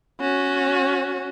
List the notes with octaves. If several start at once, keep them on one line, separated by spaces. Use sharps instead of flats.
C#4 F#4